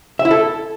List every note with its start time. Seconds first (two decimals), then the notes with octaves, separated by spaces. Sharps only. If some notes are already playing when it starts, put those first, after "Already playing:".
0.19 E5
0.25 E4
0.31 A4